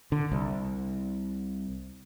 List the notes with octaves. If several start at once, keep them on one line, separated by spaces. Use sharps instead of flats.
D3
C2